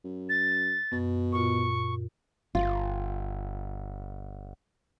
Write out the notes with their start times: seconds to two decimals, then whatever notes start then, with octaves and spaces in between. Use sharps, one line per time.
0.04 F#2
0.29 A6
0.92 F#2 B2
1.33 A#2 F4 C#6
2.55 G1 F4